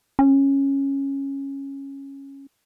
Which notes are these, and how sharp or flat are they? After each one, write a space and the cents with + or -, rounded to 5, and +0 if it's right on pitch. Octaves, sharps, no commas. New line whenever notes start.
C#4 -10